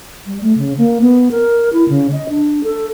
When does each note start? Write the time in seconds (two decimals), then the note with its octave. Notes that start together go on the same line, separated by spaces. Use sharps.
0.26 G3
0.42 A3
0.57 C#3
0.78 A#3
1.01 B3
1.31 A#4
1.73 E4
1.89 C#3
2.12 D#5
2.29 D4
2.64 A4